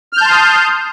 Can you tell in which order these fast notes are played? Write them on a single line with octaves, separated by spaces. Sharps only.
F6 G6 A5 C6 D#6